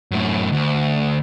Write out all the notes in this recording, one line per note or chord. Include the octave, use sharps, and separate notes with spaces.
F#2 A2
D2